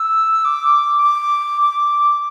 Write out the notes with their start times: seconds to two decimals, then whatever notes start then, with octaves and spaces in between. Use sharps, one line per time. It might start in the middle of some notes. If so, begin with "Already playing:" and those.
Already playing: E6
0.45 D6
1.03 D6
1.62 D6